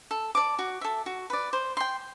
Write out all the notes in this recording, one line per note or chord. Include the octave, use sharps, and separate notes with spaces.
A4
D5 A5 D6
F#4
A4 E5
F#4
B4 D5
C5
G5 C6